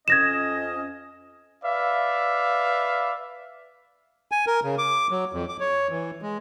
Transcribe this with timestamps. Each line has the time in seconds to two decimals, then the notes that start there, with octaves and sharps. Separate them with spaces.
0.08 F2 C#4 D#5 G#6 A#6 E7
1.65 B4 D5 E5 F5
4.32 G#5
4.47 A#4
4.64 C#3
4.78 D6
5.11 F#3
5.33 F2
5.49 D6
5.60 C#5
5.90 E3
6.22 G#3